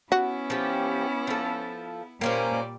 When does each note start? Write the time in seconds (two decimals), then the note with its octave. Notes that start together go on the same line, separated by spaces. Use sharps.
0.12 B3 C#4 E4 F#4
0.50 F3 G4
1.27 F3 A4
2.21 A#2 G3 A#3 C#4 C5 D5